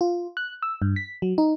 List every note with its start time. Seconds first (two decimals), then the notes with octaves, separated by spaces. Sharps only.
0.01 F4
0.37 F#6
0.62 E6
0.82 G2
0.96 B6
1.22 F#3
1.38 D#4